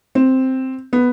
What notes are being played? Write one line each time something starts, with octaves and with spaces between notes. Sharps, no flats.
C4
B3